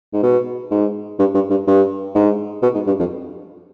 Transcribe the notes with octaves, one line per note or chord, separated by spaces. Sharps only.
G#2
B2
G#2
G2
G2
G2
G2
G#2
B2
G#2
G2
F2